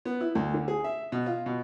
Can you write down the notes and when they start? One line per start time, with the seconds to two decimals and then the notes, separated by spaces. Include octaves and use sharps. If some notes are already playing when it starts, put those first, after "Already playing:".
0.05 B3
0.21 E4
0.35 D2
0.54 D3
0.68 G#4
0.84 E5
1.12 B2
1.26 F4
1.46 B2